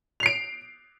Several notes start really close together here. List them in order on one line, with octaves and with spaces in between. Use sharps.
F7 C7 D7